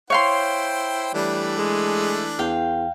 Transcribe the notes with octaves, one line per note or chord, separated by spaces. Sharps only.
E4 C5 C#5 F5 G5 C6
E3 G3 A3 D4
G#3
E2 F5 G5